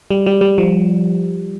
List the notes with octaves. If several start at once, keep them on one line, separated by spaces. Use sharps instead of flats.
G3
G3
G3
F3